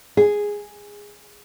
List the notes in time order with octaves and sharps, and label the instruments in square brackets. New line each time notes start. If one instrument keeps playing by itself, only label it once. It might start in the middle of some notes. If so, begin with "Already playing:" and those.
[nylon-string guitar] G#4